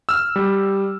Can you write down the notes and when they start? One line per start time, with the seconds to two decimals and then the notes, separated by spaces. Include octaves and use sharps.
0.09 E6 F6
0.36 G3